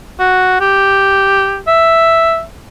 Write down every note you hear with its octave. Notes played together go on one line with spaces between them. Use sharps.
F#4
G4
E5